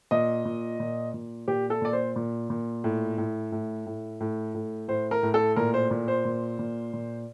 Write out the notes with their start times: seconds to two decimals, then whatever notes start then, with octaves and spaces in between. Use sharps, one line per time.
0.11 A#2 D#5
0.45 A#2
0.80 A#2
1.14 A#2
1.48 A#2 G4
1.70 A4
1.82 A#2 D5
1.93 C5
2.16 A#2
2.50 A#2
2.84 A2
3.18 A2
3.52 A2
3.86 A2
4.20 A2
4.55 A2
4.88 A2 C5
5.11 A#4
5.23 A2
5.34 A4
5.56 A#2 A#4
5.74 C5
5.91 A#2
6.08 C5
6.25 A#2
6.59 A#2
6.93 A#2